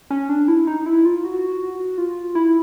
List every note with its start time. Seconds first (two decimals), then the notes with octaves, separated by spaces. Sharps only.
0.10 C#4
0.29 D4
0.48 E4
0.67 D#4
0.86 E4
1.05 F4
1.24 F#4
1.98 F4
2.35 E4